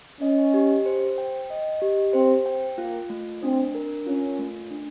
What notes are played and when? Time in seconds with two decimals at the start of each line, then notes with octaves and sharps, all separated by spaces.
0.21 C#4 D#5
0.54 G4
0.86 C5
1.18 G5
1.50 D#5
1.82 G4
2.13 C4 C5
2.46 G5
2.78 A#3 F4
3.10 A3
3.42 C4 D4
3.75 A#4
4.07 C#4 F4
4.39 A3
4.71 D4